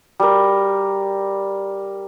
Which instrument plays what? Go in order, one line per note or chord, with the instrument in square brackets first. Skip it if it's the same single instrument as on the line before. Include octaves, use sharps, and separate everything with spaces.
[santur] G3 A#4